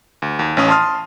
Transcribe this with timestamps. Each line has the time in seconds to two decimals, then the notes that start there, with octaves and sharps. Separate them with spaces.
0.22 D2
0.39 D#2
0.57 A1 C#4 D#6
0.68 A5 C6 D#6 F6